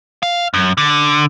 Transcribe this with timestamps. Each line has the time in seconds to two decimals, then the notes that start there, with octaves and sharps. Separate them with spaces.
0.23 F5
0.54 F#2
0.78 D3